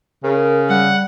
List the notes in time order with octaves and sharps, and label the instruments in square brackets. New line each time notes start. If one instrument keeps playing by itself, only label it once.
[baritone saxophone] C#3 [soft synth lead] A#4
[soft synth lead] G3 [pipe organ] F#5